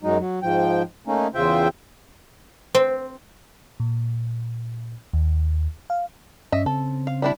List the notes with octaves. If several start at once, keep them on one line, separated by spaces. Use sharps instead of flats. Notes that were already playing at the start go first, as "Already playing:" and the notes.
F#2 F#3 G#3 D#4
F#3
G#2 F3 G5
A3 A#3 C#4 D#4
E2 C#3 F4 C5 E5 G5
C4
A#2
D#2
F5
G2 C#4 D#5 E5
C#3 C4 A4
F5
G3 D4 E4